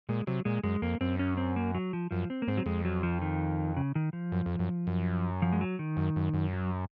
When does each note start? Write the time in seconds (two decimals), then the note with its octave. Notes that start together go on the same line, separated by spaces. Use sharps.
0.09 A#2 G#3
0.27 C3 F#3
0.45 A#2 G#3
0.63 F#2 G#3
0.82 F2 A#3
1.01 F#2 C4
1.19 C#4
1.37 C4
1.56 A#3
1.75 F#3
1.93 F3
2.11 F#2 F3
2.30 C4
2.42 A#3
2.48 G#2 C4
2.57 F#3
2.66 F2 G#3
2.85 F#3
3.03 F3
3.22 D#3
3.77 C#3
3.95 D#3
4.13 F3
4.32 F#2
4.46 F2
4.59 F#2
4.87 F#2
5.42 F3
5.52 G#3
5.61 F#3
5.79 D#3
5.97 F#2
6.16 F#2
6.34 F#2
6.53 F#3